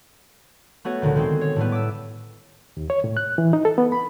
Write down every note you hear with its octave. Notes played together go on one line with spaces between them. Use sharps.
A3 B3 F#4 C#5 F#5
D2 A#2 D3 D#3
D#3 G#3 C4
C#5
A2 G3 A3 B3
D6 E6
D#2
C#5
A2
F#6
E3
D#4
A4
B3
B5